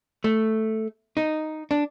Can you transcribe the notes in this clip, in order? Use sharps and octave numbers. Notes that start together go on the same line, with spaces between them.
A3
D#4
D4